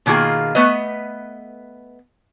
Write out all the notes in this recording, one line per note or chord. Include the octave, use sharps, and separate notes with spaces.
B2 D#3 A#3 F4 G#4
A3 B3 B4 D#5